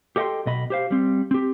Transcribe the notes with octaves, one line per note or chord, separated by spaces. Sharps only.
G4 A4 D#5 F5 G5 C6
B1 B2 D#5 B5
G4 C5 F5
G3 C4
C4 G4